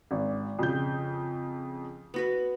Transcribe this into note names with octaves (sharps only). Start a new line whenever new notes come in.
G#1
F2 C#3 G6
B3 F#4 B4